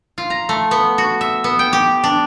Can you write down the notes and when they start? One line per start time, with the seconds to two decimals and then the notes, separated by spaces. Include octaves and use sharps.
0.18 F4
0.30 A#5
0.49 A3
0.71 B3
0.98 F#4
1.21 E5
1.44 B3
1.59 G5
1.73 G4
2.04 D4